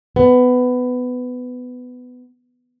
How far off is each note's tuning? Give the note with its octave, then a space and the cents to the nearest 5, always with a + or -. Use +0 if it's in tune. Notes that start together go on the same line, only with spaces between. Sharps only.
B3 +15